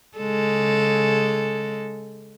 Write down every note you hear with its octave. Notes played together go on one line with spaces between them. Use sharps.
C#3 G#3 A4